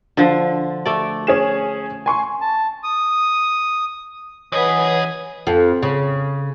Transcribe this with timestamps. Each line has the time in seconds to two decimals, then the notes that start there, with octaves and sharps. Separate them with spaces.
0.17 D3 F3
0.86 A3 D5
1.27 C#4 G#4 E7
2.06 G#5 C6 C#6
2.41 A5
2.83 D#6
4.52 F#2 E3 G#4 B4 C#5 D#5 F#5 D#6
5.47 F2
5.83 C#3